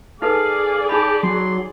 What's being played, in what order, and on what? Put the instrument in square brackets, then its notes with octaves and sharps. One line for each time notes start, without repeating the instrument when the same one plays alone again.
[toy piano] D#4 A4 B4 [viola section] G#4 D5 [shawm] F5
[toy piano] D#4 G#5 B5 [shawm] G4
[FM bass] F#3 [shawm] C6